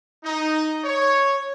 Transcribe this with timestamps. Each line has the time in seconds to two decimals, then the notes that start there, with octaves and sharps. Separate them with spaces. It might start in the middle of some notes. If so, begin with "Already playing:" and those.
0.24 D#4
0.85 C#5